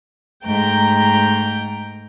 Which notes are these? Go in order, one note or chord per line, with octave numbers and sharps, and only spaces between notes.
G#2 A3 G5 A#5 G6